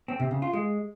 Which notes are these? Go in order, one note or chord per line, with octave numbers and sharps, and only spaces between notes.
C4
C3
C#3
F4
G#3